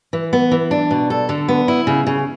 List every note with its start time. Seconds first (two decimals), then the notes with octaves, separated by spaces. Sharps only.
0.13 E3
0.33 B3
0.51 E3
0.71 D4
0.91 B2
1.10 A4
1.29 D3
1.48 B3
1.68 E4
1.87 C#3
2.07 C#3